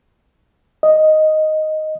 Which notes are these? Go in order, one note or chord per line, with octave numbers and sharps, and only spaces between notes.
D#5